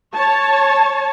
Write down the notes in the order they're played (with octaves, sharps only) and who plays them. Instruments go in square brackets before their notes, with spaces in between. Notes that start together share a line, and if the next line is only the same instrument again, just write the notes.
[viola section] C#5 A5